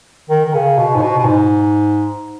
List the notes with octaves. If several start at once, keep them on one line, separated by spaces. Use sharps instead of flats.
D#3
D#3
C#3
B2
G#2
B2
B2
G#2